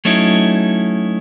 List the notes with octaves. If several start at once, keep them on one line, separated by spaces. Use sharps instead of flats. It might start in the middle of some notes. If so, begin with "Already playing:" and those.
F#3 A3 C#4 D#4 E4